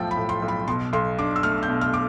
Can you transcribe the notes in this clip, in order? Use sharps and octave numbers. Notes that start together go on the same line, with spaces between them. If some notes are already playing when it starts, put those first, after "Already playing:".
Already playing: B1 A2 F3 A3 G5 A5 E6
B5
A2
C6
B1
B5
B2 C6
B1 C6
D4 D6
E6
A3 F6
G6
B2
F6
D6